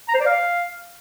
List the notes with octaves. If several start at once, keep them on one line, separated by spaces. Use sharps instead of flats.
A#5
C5
D5
F5